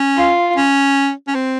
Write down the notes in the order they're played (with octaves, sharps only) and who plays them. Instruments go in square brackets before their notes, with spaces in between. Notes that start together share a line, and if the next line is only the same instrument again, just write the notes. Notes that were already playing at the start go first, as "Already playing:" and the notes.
Already playing: [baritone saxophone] C#4
[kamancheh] F4
[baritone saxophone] C#4
C#4
C4